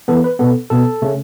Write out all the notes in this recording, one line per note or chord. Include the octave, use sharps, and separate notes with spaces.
E3 B3 A4
B4
B2 B3 A4
B2 B3 A4
C#3 A3 C#4